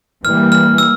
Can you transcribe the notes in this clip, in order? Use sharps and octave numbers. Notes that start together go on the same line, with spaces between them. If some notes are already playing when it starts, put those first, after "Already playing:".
E3 G3 A#3 F6
F6
E6